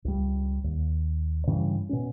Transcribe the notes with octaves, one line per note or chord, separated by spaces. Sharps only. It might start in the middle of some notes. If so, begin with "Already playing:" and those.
C#2 G3
D#2
G2 C#3 E3 G3
B2 C#4